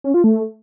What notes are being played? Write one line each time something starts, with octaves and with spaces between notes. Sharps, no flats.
C#4
F4
A3